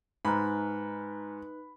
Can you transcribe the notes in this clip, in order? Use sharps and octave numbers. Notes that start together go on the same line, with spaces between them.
G#2 D#4 B4 G#5 A#5 B5 F6 F#6